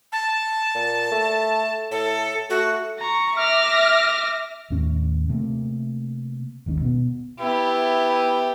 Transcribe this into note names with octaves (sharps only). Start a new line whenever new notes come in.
A5
A#2
A3
A2 A4
A3 F#4
A#5 C#6
E5 D6 F6 A#6
D#2 A2 C#4
C3 A3 A#3 C4
G#1 D#2 G#2 C#4
B2 B3
B3 E4 G4